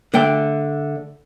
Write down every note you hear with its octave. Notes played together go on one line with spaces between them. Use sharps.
D3 A3 G5